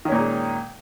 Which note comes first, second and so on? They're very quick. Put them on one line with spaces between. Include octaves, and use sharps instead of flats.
D#3 C#4 A#2 D#4 G#3